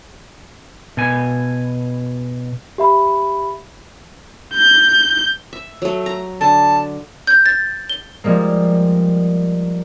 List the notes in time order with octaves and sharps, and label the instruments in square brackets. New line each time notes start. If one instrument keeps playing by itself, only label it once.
[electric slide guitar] B2 G#5
[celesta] G4 E5 B5
[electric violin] G6
[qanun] E5
F#3 A3
A#5
[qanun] D3 [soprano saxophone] A5
[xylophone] G6
A6
G7
[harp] F3 G3 G#3 A#3